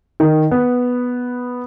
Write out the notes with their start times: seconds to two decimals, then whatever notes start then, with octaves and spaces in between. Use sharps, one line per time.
0.20 D#3
0.51 B3